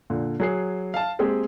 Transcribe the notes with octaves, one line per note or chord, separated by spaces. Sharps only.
A#2 D3
F#3 G#4 C7
F5 A5
G#3 A#3 C4 G4 G#4